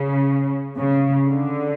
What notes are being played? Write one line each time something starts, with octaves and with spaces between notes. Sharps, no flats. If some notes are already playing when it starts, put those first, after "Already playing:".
Already playing: C#3
C#3
D3